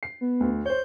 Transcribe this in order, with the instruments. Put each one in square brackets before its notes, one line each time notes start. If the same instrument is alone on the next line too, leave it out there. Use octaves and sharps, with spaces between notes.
[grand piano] C7
[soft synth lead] B3
[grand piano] D2
[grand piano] C5 C#5 [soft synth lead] G6